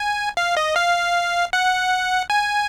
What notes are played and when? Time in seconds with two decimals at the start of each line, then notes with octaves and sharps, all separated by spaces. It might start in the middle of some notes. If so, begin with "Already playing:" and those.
Already playing: G#5
0.37 F5
0.57 D#5
0.76 F5
1.53 F#5
2.30 G#5